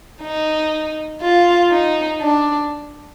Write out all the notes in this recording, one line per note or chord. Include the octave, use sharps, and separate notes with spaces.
D#4
F4
D#4
D4